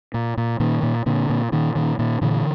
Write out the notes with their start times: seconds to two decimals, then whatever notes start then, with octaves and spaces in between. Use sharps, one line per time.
0.14 A#2
0.37 A#2
0.60 A#2 D#3
0.83 A#2
1.06 A#2 D3
1.30 A#2
1.52 A#2 D#3
1.75 A#2 D#3
1.99 A#2 D#3
2.21 A#2 D3 E3